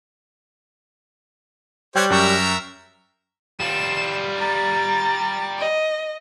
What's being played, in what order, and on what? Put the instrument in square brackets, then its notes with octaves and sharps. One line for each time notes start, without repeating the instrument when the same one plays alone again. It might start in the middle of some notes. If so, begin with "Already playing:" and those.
[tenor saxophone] G3 [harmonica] G4 C5 C#5 [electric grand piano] G5 F#6
[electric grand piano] F#2 G5 C#6 [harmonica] A#4 E5 A#5
[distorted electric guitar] G3 F4 [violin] E7
[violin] A#5 A6
D#5